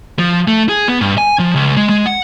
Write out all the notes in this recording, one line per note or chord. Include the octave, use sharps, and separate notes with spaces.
F3
A3
G#4
B3
G2
G#5
F3
C#2
G#3
G#3
F#5